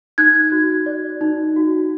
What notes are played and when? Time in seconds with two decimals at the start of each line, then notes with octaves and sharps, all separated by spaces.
0.18 D#4 F#6 G#6
0.52 F#4
0.86 D5
1.21 D#4
1.56 F#4